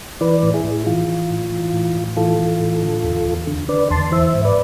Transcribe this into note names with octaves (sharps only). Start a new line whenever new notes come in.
E3 B4 D5
A2
E4 G#4
A2
E3 F4
E3
A2
E3
A2
A2
E3 F4 A4
E3
A2
D3
E2
E2
D3
D3 B4 D5
E2 A5 C6
E3 C5 E5
G#2
B4 D5